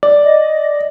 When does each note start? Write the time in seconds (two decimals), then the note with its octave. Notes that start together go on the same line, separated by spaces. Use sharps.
0.03 D5
0.21 D#5